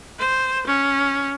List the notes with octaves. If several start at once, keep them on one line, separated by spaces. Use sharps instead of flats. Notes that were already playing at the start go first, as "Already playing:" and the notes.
C5
C#4